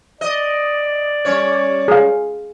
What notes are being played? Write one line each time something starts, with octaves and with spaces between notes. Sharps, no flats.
D5 D#5
G3 C#4 C#5
G#4 F5